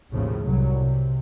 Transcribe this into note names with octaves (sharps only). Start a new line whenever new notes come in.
A1 D#2 A2 C#3 F3
C2 F#3
C3